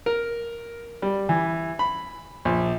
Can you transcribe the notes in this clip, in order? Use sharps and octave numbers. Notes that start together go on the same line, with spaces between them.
A#4
G3
E3
B5
A#1